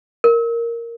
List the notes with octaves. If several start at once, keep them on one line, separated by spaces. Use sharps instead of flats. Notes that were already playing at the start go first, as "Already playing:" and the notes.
A#4